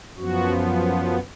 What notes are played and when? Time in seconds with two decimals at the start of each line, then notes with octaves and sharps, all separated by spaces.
0.17 F#2 F3 B3 F#4